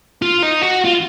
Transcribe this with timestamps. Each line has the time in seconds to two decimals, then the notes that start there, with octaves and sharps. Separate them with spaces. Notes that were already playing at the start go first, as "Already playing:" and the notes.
0.22 F4
0.43 D#4
0.62 F#4
0.85 F4